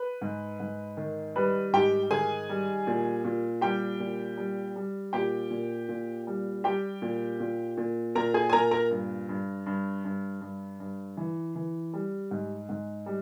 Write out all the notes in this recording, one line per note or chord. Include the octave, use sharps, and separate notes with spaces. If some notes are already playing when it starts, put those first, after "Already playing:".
Already playing: B4
G#2
G#2
D#3
G3 B4
G#2 G4 G5
D#3 G#4 G#5
G3
A#2
A#2
G3 G4 G5
A#2
G3
G3
A#2 G4 G5
A#2
A#2
G3
G3 G4 G5
A#2
A#2
A#2
A#2 A#4 A#5
G#4 G#5
G#5
A#2 A#4 A#5
A#4 A#5
G2
G2
G2
G2
G2
G2
E3
E3
G3
G#2
G#2
G3